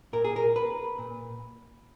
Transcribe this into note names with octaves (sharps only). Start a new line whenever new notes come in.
A#2 A#4
G#4
A#4
B4
A#2